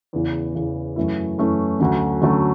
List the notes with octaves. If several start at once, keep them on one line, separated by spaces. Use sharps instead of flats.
E2 C#3 E3
E2 C#3 E3
F#2 E3 A3 C#4 E4
F#2 E3 A3 C#4 E4
D2 D3 F#3 A3 C#4
D2 D3 F#3 A3 C#4